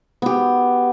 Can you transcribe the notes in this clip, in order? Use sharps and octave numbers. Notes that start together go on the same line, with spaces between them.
B3 G4